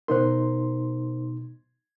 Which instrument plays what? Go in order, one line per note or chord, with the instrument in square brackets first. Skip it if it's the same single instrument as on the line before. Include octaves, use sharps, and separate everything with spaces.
[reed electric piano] B2 D#4 C6 [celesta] A#4 C5